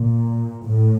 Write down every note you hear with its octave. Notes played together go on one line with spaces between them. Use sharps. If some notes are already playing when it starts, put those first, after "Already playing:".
Already playing: A#2
A2